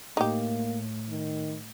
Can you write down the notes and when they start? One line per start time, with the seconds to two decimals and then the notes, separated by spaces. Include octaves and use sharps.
0.17 A2 A#3 D#4 G4
1.09 D#3